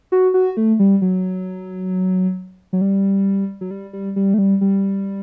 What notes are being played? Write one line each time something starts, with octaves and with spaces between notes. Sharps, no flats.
F#4
F#4
A3
G3
F#3
F#3
G3
F#3
G3
G3
G3
A3
G3
G3